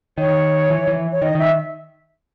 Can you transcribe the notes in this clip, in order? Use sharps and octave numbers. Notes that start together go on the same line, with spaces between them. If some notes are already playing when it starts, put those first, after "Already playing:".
D#3 C#5
E3
E3
C#5
D#3 D#5
D#3 E5